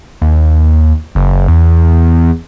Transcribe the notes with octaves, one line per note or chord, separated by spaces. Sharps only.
D#2
F#1
E2